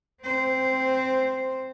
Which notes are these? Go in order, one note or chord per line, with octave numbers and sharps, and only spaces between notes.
C4 C5